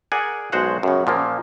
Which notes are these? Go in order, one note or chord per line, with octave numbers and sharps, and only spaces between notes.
G#4 A#4 D5 F#5 G#5
B1 G#3 F#4 C5 C#5 F#5
F#2 C#3
A#2 F3 A#3